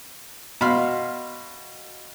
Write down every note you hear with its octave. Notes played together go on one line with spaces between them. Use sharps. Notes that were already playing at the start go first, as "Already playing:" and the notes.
B2 F5 B5 C6 F6